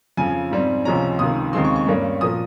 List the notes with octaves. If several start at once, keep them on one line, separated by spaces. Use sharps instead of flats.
F2 C#3 F3 G#5
G#2 G3 C4
C#2 C3 F3 G#3 C#4 A#5
C#2 C3 D#3 D#6
D#2 C#3 G#3 C4 C6
C#6
C#6
G2 G3 A#3 C#4
A#2 F3 A#3 D#6